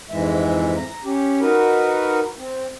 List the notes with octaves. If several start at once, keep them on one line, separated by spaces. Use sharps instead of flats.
F2 G#2 E3 G#3 E5
A#5
C#4 G4
D#4 F#4 A#4 B4
C4